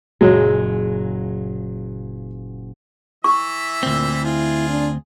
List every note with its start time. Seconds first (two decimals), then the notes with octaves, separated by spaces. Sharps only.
0.21 F#1 A#2 F#3 G#3 E7
3.24 E3 E5 C#6
3.83 D2 A#2 C4
4.24 E4 F4 G#4
4.69 D4